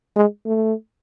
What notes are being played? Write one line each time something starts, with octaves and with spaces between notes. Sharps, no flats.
G#3
A3